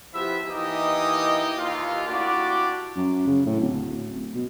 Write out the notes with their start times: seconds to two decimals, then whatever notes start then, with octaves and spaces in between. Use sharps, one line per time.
0.14 F3 B3 E4 G4 E5
0.47 E3 A#3 D#4 E4 G4 D#5
1.58 D#2 F4
2.07 A3 D4 E4 F#4 G4 D5
2.96 F#2
3.27 C#3
3.46 A2
3.60 D1
4.35 B2